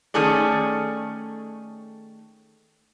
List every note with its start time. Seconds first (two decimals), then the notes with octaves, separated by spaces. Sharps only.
0.14 D#3 A3 C#4 G#4 A4 D5